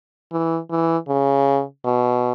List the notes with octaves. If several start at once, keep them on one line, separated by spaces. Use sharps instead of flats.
E3
E3
C#3
B2